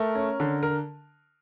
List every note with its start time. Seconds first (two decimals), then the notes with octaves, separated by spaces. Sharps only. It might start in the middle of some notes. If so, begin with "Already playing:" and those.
Already playing: A3 A#4
0.15 C#4
0.40 D3
0.63 A#4